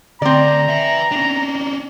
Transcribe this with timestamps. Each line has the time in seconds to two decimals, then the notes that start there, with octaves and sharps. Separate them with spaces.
0.22 D2 C4 D5 A#5
0.69 B4 E5
1.11 C#4 D4